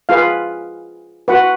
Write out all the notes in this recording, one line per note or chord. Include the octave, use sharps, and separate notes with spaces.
F4 G#4 B4 F5
F#4 B4 F#5